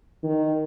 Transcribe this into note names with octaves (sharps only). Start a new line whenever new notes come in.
D#3